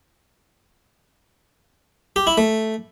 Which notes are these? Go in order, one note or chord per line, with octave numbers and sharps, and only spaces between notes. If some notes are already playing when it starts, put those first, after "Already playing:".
G4
E4
A3